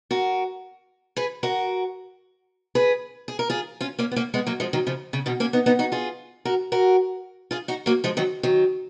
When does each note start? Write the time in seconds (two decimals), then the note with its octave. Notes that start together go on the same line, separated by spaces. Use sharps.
0.11 F#4 A#4
1.16 G#4 B4
1.43 F#4 A#4
2.75 G#4 B4
3.28 G#4
3.39 A#4
3.50 F4 G#4
3.81 C#4 F4
3.99 A#3 C#4
4.11 B3
4.16 A#3 C#4
4.34 G#3 B3
4.47 F#3 A#3
4.60 F3 G#3
4.73 D#3 F#3
4.87 C#3 F3
5.13 C#3
5.26 B2 D#3
5.40 A#3 C#4
5.53 B3 D#4
5.66 B3 D#4
5.79 D#4 F#4
5.92 F4 G#4
6.45 F#4 A#4
6.72 F#4 A#4
7.51 F4 G#4
7.68 D#4 F#4
7.86 F#3 A#3
8.04 F3 G#3
8.17 D#3 F#3
8.43 D#3 F#3